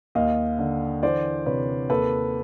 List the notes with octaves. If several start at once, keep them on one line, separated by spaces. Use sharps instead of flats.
D#2 D#5 F5
D3
E3 C5 D5
C3 B4 C#5
D#2 A4 B4